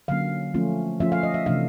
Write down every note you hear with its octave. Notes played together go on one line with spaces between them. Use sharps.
D3 F#3 A#3 C#4 F5
F3 A3 C#4 F4
F3 A3 C#4 F4 E5
F5
D#5
E5
C3 E3 A3 D4 F5